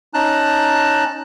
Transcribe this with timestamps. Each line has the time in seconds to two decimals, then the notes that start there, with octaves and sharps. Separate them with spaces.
0.14 C#4 D#4 A5 A#5 F#6